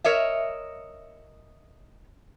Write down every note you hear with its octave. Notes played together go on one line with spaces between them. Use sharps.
A#4 C#5 D#5 E5